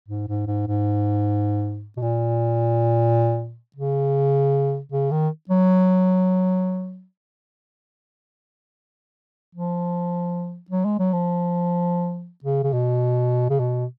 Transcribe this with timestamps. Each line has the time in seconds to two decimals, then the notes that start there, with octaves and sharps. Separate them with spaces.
0.08 G#2
0.28 G#2
0.47 G#2
0.67 G#2
1.97 B2
2.02 A#2
3.76 C#3
4.92 C#3
5.11 D#3
5.49 F#3
9.55 F3
10.70 F#3
10.85 G#3
10.99 F#3
11.13 F3
12.44 C#3
12.63 C#3
12.73 B2
13.50 C#3
13.59 B2